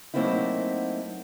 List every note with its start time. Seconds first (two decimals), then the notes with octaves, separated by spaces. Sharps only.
0.14 F#3 A3 A#3 C4 D#4 E4